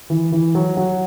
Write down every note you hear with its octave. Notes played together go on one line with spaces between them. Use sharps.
E3
E3
F#3
F#3